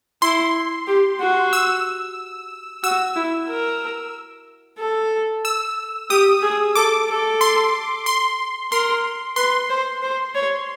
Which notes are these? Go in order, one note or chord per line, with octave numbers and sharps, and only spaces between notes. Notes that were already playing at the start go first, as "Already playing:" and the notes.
E4 C6
G4
F#4
E6
F#4 E6
E4
A#4
A4
E6
G4 D#6
G#4
A4 D6
A4
C6
C6
A#4 C6
B4 C6
C5
C5
C#5